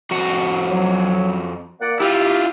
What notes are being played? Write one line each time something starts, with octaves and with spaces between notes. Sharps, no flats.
F2 F#4 F#5
F#3
A#3 D5 F#5
E4 F4 G4